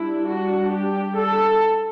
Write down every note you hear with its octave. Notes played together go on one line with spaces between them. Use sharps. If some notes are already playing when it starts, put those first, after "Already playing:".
Already playing: G3 D4 E4
F#4
G4
A4